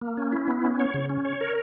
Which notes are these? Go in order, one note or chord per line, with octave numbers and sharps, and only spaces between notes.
A#3
C#4
E4
B3
C#4
C#5
C#3
C#4
C#5
A#4